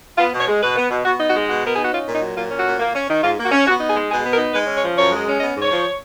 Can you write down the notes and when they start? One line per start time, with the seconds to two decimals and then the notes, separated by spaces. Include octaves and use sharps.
0.18 B3 F4
0.32 B2
0.40 C#5
0.48 G#3
0.62 B2 B4
0.76 B3
0.90 B2
1.05 B3 F#4
1.19 D#4
1.27 F#4
1.34 G#3
1.48 B2 F#4
1.63 B3 A#4
1.75 D#4 G#4
1.83 F#4
1.92 C#4 F4
2.06 A#2
2.14 D#4
2.21 F#3
2.35 A#2 F4
2.50 C#4
2.57 F#4
2.65 A#2
2.79 A#3
2.94 C#4
3.08 D#3
3.22 G#2 F4
3.37 A#3
3.45 F#4
3.51 C#4
3.66 B3 F#4
3.81 D#4
3.88 G#4
3.95 G#3
4.10 B2 G#4
4.24 B3
4.32 A#4
4.38 D#4
4.53 G#3 B4
4.67 C#4
4.75 C#5
4.83 F3
4.97 F#2 C#5
5.11 G#3
5.26 C#4
5.40 B3 D#5
5.55 G#2
5.62 C#5
5.70 F3